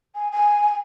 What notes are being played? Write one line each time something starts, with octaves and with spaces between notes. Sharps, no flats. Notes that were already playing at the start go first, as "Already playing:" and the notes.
G#5
G#5